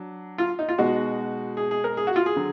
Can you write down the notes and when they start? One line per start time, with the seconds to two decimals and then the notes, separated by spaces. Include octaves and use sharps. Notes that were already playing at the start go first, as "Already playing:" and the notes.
Already playing: F#3 D4
0.38 F4
0.59 D#4
0.69 F4
0.78 B2 G#3 D#4 F#4
1.57 G#4
1.71 G#4
1.84 A#4
1.97 G#4
2.07 F#4
2.16 F4
2.26 G#4
2.36 D3 F#3